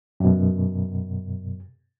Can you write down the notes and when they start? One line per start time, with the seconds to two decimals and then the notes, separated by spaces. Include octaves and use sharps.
0.20 F#2 B2